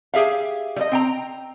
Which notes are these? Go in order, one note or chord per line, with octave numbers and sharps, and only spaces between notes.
G4 G#4 E5 F5
G3 D#5
C4 G5 A#5